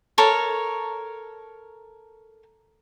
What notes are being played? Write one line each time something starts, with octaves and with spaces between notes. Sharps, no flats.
A4 A#4 C#5